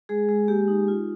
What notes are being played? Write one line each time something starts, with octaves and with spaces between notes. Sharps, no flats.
G#3 G#4
G#3
A#3 G4
D#4
F4